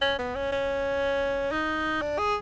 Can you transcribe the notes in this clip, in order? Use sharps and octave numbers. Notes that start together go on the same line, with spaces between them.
C#4
B3
C#4
C#4
D#4
D4
G#4